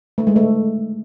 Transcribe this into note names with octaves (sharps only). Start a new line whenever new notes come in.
A3
G#3
A3